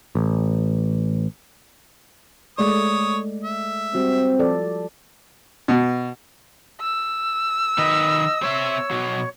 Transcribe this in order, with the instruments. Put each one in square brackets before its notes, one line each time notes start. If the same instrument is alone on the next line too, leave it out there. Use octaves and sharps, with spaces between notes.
[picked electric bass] A1
[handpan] G#3 A3 D5 [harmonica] C#5 D#6
[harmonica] E5
[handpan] G3 F#4 [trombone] C4
[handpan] F3 A4 D5
[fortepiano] B2
[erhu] E6
[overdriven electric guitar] D#3 B4 [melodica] D#5
[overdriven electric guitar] C4 E5 [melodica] C#5
[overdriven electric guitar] B2 F#3